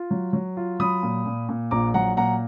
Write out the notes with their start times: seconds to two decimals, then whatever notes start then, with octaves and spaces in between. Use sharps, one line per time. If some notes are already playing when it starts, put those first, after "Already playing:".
Already playing: F4
0.11 F#3
0.33 F#3
0.57 F4
0.80 F#3 B5 D#6
1.03 A#2
1.26 A#2
1.49 A#2
1.71 A#1 A#5 D6
1.94 F#3 F#5 A#5
2.17 A#2 F#5 A#5